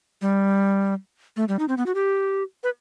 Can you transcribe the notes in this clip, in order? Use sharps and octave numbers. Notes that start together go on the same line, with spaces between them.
G3
A3
G3
D#4
C4
B3
F#4
G4
B4